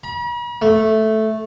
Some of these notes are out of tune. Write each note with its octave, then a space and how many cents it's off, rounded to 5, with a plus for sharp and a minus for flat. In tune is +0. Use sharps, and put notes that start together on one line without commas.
B5 -45
A3 -5